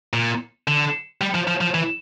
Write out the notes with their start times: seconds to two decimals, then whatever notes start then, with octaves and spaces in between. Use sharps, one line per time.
0.13 A#2
0.68 D3
1.21 G3
1.35 F3
1.48 F3
1.61 F3
1.74 E3